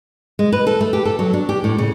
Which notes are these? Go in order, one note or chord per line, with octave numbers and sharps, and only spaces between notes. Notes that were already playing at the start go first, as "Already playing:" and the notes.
G#3
B4
A4
A3
G4
A4
F#3
D4
G4
A2
C#3